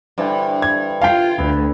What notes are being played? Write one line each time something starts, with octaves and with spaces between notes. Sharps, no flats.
G2 D3 E3 C5
G#6
F4 F5 G5
D2 D3 B3 B4 E5